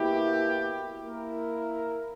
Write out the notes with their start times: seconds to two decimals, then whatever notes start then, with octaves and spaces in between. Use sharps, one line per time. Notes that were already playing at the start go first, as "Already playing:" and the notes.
Already playing: B2 A#3 E4 G4
1.02 A#3 E4 A#4